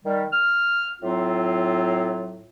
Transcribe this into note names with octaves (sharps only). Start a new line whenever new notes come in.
D#3 G3
F6
A2 F#3 C4 F4